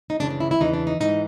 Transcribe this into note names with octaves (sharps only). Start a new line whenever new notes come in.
D#4
F#2 C#3 E3 D4
D4
E4
E4
E2 C#3 E3 D#4
D4
D#4
G#2 E3 D#4